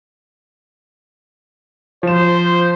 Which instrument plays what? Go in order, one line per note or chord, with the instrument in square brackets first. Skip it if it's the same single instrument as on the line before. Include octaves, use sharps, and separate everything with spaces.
[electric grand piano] F3 E7 [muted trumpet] C5